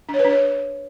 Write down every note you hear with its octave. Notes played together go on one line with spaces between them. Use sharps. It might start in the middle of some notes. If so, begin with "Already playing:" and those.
D4
C#5
B4
D4
C#5